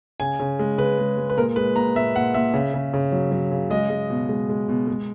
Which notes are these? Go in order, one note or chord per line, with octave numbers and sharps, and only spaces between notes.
C#3 G#5
C#3
G#3
C#3 B4
G#3
G#3
B4
A#2 A#4
G#3 B4
A#2 A#5
A#2 E5
A#2 F#5
A#2 E5
C#3
C#3
C#3
F#3
F#3
C#3
G#3 D#5
G#3
B2
G#3
G#3
B2
G#3